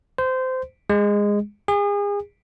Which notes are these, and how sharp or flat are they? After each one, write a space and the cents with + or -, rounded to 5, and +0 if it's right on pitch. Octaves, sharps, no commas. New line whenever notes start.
C5 -20
G#3 -15
G#4 -35